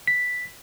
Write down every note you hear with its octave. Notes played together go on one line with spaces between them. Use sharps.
B6